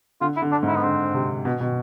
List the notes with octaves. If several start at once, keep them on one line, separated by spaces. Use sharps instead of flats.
D3 F4
E4
D3
D4
G#2
E4
B3
D3 C4
C3
B2
B2